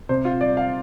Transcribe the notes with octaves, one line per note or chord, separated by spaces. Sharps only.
C3 C5
F4
G3 D5
F5